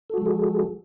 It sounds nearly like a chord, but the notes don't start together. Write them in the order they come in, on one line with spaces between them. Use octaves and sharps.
A4 F#4 G#3 F3 G#4